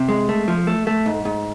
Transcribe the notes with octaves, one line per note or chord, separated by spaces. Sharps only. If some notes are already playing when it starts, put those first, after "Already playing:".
Already playing: C3
G#3
A3
F3
A3
A3
G#2
G#2